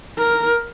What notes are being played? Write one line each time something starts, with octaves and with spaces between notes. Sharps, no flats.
A#4